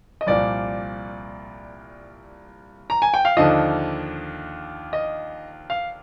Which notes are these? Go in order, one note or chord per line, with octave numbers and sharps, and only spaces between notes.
D#5
C2 A#2 F3 D5
A#5
G#5
G5
F5
D#2 D3 F3 D#5
D#5
F5